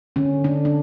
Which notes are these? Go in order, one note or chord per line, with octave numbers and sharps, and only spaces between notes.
D3 C#4
D3 D4
D4